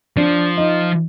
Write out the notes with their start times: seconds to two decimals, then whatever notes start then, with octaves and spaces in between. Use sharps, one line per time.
0.17 F3 D4
0.57 D#4